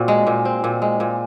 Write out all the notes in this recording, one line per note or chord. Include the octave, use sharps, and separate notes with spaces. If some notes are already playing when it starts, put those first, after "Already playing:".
Already playing: A#2 C4 F#4
G#3
A#2
C4
A#2
G#3
A#2